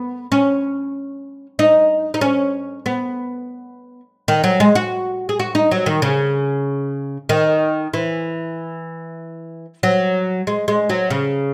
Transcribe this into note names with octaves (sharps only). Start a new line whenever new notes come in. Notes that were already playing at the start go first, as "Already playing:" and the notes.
Already playing: B3
C#4
D#4
D#4
C#4
B3
D#3
F#3
G#3
F#4
G#4
F#4
D#4
F#3
D#3
C#3
D#3
E3
F#3
G#3
G#3
F#3
C#3